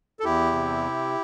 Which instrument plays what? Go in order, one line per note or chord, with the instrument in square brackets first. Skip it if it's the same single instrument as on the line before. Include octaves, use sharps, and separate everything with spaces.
[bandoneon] A4
E2 E4 G4
C3